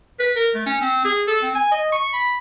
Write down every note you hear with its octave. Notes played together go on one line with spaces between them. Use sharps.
B4
A#4
A3
C#4
C4
G#4
A4
C4
G#5
D#5
C#6
B5